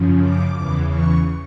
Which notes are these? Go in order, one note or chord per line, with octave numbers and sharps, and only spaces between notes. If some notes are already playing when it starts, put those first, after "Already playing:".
Already playing: F#2 C#3 F3
D6
E2 C#3 E3
C#6